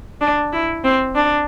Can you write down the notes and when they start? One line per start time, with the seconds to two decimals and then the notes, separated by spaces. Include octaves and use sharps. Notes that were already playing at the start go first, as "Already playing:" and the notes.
0.21 D4
0.53 E4
0.84 C4
1.15 D4